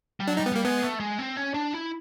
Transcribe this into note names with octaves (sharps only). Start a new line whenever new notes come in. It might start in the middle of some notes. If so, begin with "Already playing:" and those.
G3
F#3 D4
D#4
G3
B3
G3 A#3
G#3 B3
A3
G#3
C4
C#4
D4
E4